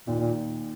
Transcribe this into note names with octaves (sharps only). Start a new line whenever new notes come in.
D#2 A#2 D#3
A#2